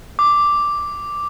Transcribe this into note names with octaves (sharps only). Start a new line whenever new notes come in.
D6